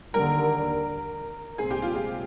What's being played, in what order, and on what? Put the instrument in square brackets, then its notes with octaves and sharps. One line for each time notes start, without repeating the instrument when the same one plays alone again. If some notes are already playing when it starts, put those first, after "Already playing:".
[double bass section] D#2 D3 G3 [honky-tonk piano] A#4
[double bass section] C2 A#2 G#3 C4 [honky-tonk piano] G#4
[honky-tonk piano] G4
F4
G4